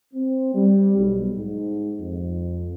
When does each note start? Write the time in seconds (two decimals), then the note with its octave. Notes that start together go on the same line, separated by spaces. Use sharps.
0.14 C4
0.53 G3
0.97 B1
1.36 G#2
2.00 F2